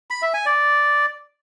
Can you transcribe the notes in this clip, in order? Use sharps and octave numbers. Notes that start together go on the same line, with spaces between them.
B5
E5
G#5
D5